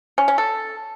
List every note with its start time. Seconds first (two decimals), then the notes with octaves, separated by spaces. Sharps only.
0.18 C#4
0.28 C#4
0.38 A4